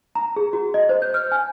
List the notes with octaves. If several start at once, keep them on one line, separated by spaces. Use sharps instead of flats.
A#5
G#4
F#4
D#5
C5
G6
F6
G#5